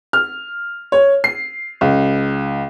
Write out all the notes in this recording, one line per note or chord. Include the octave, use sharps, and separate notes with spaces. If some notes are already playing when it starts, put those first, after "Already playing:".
F6
C#5
C7
C#2